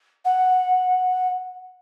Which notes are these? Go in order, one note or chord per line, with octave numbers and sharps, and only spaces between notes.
F#5